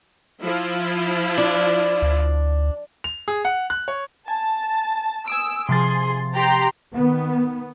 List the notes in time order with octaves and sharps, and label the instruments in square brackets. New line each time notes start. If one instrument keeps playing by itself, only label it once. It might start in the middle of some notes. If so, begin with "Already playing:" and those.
[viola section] F3 E4 F4
[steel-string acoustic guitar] D4
[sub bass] D2
[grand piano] F7
G#4
F#5
F#6
C#5
[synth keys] G#5 [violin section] A5
[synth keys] G#5 D#6 D7 [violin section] E6
[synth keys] C3 F3 A6 [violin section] G#4 C6
[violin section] G4 A#5 C6
[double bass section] D#3 B3